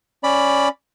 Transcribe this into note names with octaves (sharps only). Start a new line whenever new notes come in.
C#4 D5 B5